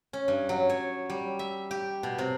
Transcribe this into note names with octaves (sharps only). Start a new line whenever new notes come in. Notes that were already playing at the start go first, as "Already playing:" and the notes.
C#4
G2
F#3
C#5
G3
E5
G4
B2
C3